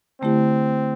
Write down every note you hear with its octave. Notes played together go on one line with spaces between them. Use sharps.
D3 A3 C4 E4 G4